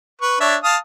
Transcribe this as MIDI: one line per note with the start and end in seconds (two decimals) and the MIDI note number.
0.21 0.39 71
0.21 0.39 85
0.40 0.56 62
0.40 0.56 73
0.40 0.56 76
0.64 0.77 77
0.64 0.77 81
0.64 0.77 87